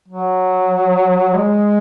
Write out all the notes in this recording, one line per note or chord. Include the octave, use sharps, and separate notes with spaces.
F#3
G#3